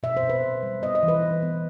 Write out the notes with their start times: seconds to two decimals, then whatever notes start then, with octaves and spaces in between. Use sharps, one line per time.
0.03 B2 E5
0.17 C5
0.23 B2
0.30 B4
0.43 B2
0.63 G3
0.82 B3 D#5
0.95 D#5
1.03 E3
1.08 B4
1.23 E3
1.42 B3